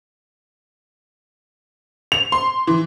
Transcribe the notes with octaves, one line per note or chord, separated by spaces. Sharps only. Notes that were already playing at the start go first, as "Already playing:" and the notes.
F7
C6
E3